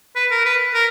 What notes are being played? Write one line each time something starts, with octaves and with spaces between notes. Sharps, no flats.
B4
A#4
B4
A#4